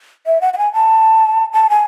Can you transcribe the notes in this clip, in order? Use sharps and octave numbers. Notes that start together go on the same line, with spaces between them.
E5
F#5
F#5
G#5
A5
A5
G#5